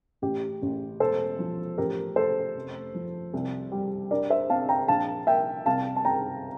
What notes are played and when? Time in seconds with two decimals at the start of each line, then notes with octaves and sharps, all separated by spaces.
0.22 A1 G4
0.62 A1
1.00 E1 A4 C5
1.39 F3
1.78 A1 G4 A#4
2.16 A3 A4 C5
2.56 F1
2.94 F3
3.33 C2
3.72 G3
4.11 G2 A#4 D5
4.30 C5 E5
4.50 C4 F5 A5
4.69 G5 A#5
4.88 A#1 F5 A5
5.27 A#3 E5 G5
5.66 C2 F5 A5
5.96 A5
6.05 C4 G5 A#5